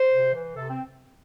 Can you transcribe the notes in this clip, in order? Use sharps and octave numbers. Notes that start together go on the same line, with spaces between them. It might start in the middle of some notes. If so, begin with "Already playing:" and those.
Already playing: C5
C3
E3
C3 A4
C4